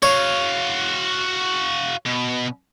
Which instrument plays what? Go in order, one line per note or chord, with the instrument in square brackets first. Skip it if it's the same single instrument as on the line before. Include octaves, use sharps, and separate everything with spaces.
[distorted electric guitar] F#4 F5 [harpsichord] C#5
[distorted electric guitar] B2